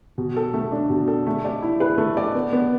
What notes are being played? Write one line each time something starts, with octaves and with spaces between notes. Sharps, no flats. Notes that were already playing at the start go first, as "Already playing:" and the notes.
B2
A4
A3
D4
B2
A4
A3
D5
E4
B4
A3
D5
B3
B3